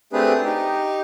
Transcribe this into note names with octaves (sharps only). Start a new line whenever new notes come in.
A3 C4 D4 G4 G#4 B4
D#4 G4